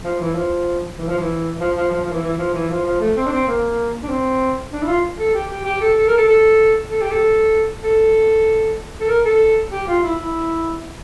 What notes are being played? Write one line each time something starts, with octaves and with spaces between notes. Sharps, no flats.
F3
E3
F3
E3
F3
E3
F3
F3
F3
F3
E3
E3
F3
E3
F3
F3
A3
C4
D4
C4
A#3
D4
C4
D4
E4
F4
A4
G4
G4
G4
A4
A4
A#4
A4
A4
A4
G4
A4
A4
A4
A#4
A4
G4
F4
E4
E4